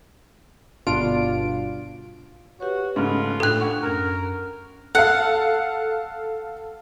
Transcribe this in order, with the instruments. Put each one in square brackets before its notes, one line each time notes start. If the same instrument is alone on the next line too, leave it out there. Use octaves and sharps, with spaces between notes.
[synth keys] G1 B2 D4 F4 D7
[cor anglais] F#4 [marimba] G4 B4 C#5
[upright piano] G#2 C#3 A3 [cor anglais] F4 [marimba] B5
[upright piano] A2 G5 F7 [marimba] D4 G#6 [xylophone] A4 F#6
[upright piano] F#5 C#6
[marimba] F#2 C#4 G#6 [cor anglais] A#4
[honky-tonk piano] A4 F5 [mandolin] F#5